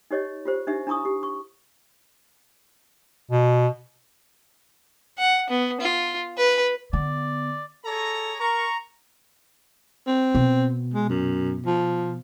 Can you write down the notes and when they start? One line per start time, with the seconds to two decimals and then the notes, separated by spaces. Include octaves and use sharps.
0.11 D#4 G4 C#5 D#5
0.45 F4 G4 C5
0.67 D4 D#4 G4 E5
0.87 D4 E4 A#5 C#6 D#6
1.05 G4
1.23 C#6
3.31 B2
5.18 F#5
5.50 B3
5.81 F4
6.37 B4
6.93 D3 B3 D5
7.85 G#4 A4 C#5 A#5
8.40 A#4 A#5 C#6
10.07 C4
10.35 B2
10.94 G#3
11.10 F#2
11.66 F3